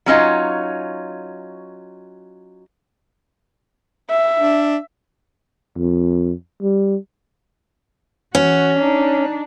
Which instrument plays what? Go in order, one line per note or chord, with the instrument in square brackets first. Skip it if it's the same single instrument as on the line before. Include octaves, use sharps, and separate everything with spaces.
[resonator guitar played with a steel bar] F#3 C#4 D#4 F4
[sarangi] E5
[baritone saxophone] D4
[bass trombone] F2
G3
[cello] E3 F#4 [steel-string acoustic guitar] C#4
[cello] D4 D#4